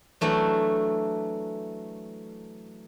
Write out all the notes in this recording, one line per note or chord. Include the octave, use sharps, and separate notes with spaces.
E3 F#3 A3 D4